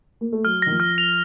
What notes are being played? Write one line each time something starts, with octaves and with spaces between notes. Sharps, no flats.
A#3
A3
F#3 F6
D#3 A#6
F3
F6
F7